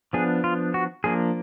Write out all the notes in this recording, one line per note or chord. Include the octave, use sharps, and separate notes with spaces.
F3 B3 D4 G#4
F4
F#4
F3 A#3 D4 G#4